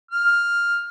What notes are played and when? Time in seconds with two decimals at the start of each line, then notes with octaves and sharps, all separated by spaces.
0.11 F6